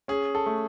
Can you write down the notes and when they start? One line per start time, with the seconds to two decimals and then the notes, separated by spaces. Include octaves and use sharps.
0.08 C#4 G#4
0.35 A4
0.46 A3